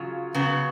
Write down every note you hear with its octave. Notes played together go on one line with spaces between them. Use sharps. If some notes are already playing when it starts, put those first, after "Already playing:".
Already playing: C#3 F#3 F4
C#3 F#3 B3